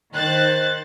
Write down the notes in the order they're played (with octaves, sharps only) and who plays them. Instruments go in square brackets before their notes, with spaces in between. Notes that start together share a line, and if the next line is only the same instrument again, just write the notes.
[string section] D#3 C5 F#6 A6